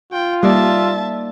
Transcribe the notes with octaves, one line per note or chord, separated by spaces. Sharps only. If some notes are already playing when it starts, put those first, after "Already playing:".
F4 G5
G3 A#3 D#4 D5 E5 A5